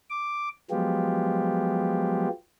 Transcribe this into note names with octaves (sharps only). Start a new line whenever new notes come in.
D6
F3 F#3 G#3 B3 F4 G4